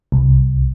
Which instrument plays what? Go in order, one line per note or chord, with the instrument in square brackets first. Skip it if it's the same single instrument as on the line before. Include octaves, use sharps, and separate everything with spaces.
[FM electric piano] C2